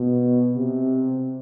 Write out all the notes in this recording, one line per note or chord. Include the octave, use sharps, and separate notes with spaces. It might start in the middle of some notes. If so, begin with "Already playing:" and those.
Already playing: B2
C3